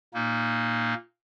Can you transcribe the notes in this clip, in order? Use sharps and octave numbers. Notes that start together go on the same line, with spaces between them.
A#2 A#3 D#4